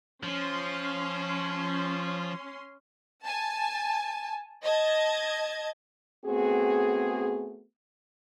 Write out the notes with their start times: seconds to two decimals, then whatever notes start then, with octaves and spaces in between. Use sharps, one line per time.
0.23 F3 C#4 C6
3.24 G#5 A5
4.63 D#5 A5 G#6
6.25 A3 B3 C4 F#4 G#4